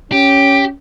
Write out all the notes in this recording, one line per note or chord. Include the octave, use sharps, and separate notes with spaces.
C#4 G4 D7